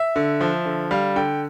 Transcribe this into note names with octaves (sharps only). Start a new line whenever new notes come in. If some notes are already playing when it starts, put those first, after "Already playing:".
Already playing: E5
D3
F3
D3
G3 F5
D3 G5